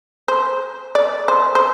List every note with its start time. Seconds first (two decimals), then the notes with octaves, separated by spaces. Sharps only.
0.28 C5
0.95 D5
1.28 C5
1.55 C5